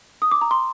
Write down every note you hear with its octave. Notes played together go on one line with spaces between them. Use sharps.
D#6
D6
A#5
C6